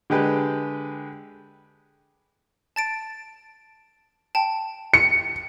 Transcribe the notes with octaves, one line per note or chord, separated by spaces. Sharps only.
D3 G#3 G4 B4
A5 A6 D7
G5 A5
C#7